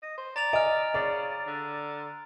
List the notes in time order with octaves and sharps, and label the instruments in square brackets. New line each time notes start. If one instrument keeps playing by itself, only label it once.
[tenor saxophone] D#5
C5
[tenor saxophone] D5 [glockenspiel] A#5 A6 F7
[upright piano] D#5 G#5 [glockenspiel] F6 D7
[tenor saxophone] C#3 [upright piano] D5
[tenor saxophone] D3